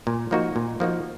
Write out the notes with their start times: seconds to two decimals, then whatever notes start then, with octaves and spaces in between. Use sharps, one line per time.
0.07 A#2
0.31 F3 A#3 D#4 F#4
0.56 A#2
0.80 F3 A#3 D#4 F#4